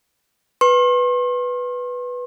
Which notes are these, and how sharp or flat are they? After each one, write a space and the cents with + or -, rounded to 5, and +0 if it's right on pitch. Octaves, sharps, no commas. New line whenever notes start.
B4 +0 C6 +45